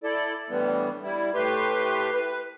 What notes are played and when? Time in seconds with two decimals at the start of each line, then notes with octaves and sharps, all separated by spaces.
0.04 E4 A4 D5
0.50 A2 D3 E3 G3 B3
1.03 G3 E4
1.34 A2 A3 G4 B4 C6
2.13 B4